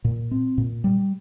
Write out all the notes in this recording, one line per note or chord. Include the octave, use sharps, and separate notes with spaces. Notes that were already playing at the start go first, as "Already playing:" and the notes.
A#2
C4
A#2
G3